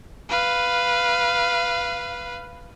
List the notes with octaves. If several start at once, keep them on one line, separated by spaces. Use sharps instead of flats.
B4 F5